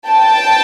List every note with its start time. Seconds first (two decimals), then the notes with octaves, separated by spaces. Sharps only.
0.10 G5 A5